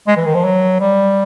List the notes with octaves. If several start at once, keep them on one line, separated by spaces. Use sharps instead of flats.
G#3
E3
D#3
F3
F#3
G3